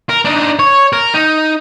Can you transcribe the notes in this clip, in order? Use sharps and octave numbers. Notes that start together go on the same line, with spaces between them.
A#4
D4 D#4
C#5
A#4
D#4